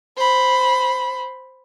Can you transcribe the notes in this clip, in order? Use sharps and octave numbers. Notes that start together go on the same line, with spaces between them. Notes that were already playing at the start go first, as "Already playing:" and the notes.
C5 B5